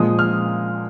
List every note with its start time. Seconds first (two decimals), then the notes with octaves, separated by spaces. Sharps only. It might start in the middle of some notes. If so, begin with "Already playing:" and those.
Already playing: A#2 F3 G#3 D#6
0.19 F6